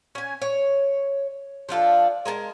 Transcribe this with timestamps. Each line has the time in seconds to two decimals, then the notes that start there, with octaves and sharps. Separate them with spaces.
0.15 C#4 G#5
0.42 C#5
1.69 F3 D4 F4 A4
2.25 G#3 A#4 G#5 A5